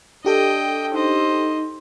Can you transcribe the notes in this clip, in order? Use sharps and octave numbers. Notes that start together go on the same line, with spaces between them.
D4 G4 A4 D#5 G5
D#4 C5 D#5